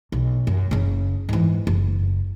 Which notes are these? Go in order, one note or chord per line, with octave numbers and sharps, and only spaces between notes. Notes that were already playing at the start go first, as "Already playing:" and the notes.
B1
F#2
F#1 C#3
G#2 E3
F#1